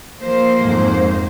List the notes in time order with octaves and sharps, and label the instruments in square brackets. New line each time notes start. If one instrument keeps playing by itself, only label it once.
[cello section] F3 A#3 C5
[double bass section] F2 G#2